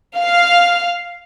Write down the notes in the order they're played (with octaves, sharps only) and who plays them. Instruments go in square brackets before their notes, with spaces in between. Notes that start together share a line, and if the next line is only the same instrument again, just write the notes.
[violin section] F5